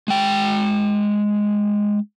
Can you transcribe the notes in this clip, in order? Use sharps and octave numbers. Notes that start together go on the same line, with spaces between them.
G#3 G5